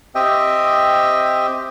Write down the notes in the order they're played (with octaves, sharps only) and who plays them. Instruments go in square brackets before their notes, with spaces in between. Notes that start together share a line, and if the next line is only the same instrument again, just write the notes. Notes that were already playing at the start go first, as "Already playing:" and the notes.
[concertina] C4 G4 D#5 E5 G5